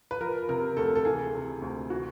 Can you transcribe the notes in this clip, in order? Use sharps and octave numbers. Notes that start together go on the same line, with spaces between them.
B4
F3 A#4
C3 A#4
D2 A4
A4
E3 G#4
C3
D2
E3 F#4